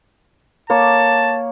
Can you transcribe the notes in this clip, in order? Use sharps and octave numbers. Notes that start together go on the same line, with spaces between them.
A#3 C#5 A5